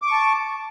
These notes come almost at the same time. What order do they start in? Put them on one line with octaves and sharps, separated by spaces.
D6 C#6 A5